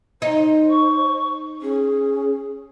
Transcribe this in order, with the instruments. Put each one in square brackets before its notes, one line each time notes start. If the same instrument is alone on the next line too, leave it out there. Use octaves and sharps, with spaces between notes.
[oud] D#4 [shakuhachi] C5
[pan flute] C#6
[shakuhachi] C#4 [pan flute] G#4